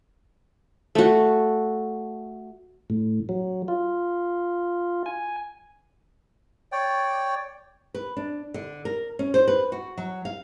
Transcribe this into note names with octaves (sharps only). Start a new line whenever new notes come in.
A3 F#4
A2
F#3
F4
G#5
C#5 D5 G5
B4
D4
D3
A#4
C#4
C5
B4
F#4
F#3
F5